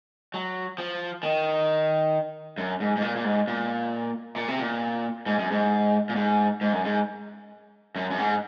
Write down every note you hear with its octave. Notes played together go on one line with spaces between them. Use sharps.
F#3
F3
D#3
F#2
G#2
G#2
A#2
A#2
G#2
A#2
A#2
C3
A#2
G#2
F#2
G#2
A#2
G#2
G#2
F#2
G#2
F#2
F#2
G#2